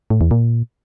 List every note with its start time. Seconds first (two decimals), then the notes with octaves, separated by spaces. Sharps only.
0.10 A2
0.21 E2
0.31 A#2